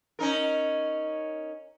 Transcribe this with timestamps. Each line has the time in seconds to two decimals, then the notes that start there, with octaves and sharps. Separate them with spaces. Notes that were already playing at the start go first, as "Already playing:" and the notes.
0.19 C#4 D#4 A#4